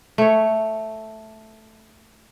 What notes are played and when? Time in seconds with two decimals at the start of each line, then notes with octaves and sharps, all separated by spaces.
0.18 A3 C#5